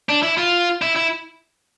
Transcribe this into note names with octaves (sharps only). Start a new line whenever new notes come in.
D4
E4
F4
E4
E4